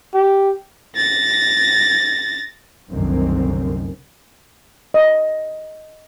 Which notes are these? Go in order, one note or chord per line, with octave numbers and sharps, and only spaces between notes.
G4
A6 A#6
F1 C2 F#2 D3 D#3 C4
D#5